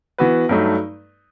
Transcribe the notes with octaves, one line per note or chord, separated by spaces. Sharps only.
E3 B3 F#4 B4
G2 F#3 A3 D#4